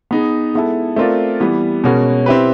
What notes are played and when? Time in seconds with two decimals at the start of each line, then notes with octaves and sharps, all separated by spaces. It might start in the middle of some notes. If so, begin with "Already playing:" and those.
0.11 B3 D#4 G#4
0.54 G#3 B3 E4 A4
0.96 A3 C4 F4 A#4 D5
1.40 E3 G3 B3
1.84 B2 G#3 C#4 F#4 A#4
2.26 C4 E4 G4 B4